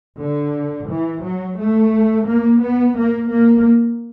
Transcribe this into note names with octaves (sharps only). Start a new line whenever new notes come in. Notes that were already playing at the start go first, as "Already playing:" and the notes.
D3
E3
F#3
A3
A#3
B3
A#3
A#3